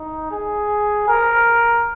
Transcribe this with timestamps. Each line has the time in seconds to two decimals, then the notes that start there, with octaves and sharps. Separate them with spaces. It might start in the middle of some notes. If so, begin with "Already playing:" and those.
Already playing: D#4
0.31 G#4
1.08 A#4